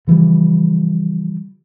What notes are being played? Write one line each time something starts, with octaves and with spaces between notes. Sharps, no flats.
C#3 E3 F3 G3